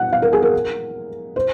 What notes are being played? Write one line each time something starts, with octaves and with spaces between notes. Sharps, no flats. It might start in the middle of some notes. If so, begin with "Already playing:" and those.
Already playing: F#5
F5
A#4
G#4
A#4
C5